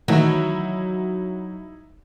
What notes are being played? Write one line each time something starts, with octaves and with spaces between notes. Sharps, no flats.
D#3 E3 F#3 A3 D#4 E4 E5